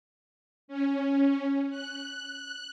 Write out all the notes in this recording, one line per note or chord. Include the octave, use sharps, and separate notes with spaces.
C#4
F#6